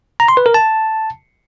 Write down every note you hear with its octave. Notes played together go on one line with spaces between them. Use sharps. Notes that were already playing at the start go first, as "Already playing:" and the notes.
A#5
C6
B4
A#4
A5